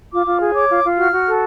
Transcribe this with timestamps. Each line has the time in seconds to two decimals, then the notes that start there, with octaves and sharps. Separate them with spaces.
0.12 F4 D6
0.26 F4
0.40 G#4
0.54 C#5 D6
0.69 F4
0.84 F4
0.97 F#4 F6
1.12 F#4
1.27 A4